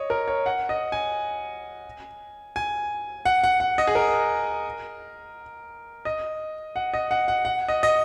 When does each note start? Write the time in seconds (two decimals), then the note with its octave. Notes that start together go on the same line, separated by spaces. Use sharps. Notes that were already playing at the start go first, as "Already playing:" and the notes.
Already playing: C#5 D#5
0.10 A#4
0.28 C#5
0.46 F#5
0.69 D#5
0.92 G#5
2.56 G#5
3.25 F#5
3.43 F#5
3.60 F#5
3.78 D#5
3.87 G#4
3.95 A#4
6.05 D#5
6.76 F#5
6.94 D#5
7.11 F#5
7.28 F#5
7.45 F#5
7.68 D#5
7.83 D#5